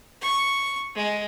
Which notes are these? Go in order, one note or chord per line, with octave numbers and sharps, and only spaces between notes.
C#6
G#3